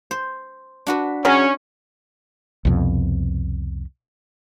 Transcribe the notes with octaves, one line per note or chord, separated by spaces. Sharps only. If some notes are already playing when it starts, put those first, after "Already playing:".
C5
D4 F#4 B4
C#3 F#3 C#4
C2 F2 B2